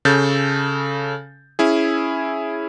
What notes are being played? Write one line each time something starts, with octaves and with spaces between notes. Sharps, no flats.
C#3 A4 G6 A6
C#4 E4 G#4